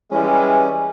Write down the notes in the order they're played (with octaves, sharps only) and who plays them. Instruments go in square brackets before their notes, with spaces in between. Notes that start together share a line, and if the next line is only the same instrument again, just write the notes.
[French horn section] E3 G3 G#3 [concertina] C#4